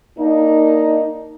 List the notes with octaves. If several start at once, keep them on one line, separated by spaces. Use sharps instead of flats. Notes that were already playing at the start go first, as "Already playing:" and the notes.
A#3 D4 D#4